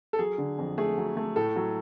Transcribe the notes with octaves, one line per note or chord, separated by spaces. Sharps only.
A4
F#3 G#4
D3
F2
A3 G#4
F#3
A3
A2 A4
F#3